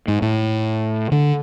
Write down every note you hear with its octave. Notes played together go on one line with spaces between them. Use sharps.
G#2
A2
D3